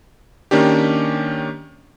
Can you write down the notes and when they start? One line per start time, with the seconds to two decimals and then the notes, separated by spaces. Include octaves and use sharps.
0.51 D#3 A#3 C#4 D4 G4